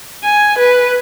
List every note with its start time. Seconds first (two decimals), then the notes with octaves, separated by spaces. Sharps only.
0.24 G#5
0.58 B4